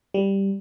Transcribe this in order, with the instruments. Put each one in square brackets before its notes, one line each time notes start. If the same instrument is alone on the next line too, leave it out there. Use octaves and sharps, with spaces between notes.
[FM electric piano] G3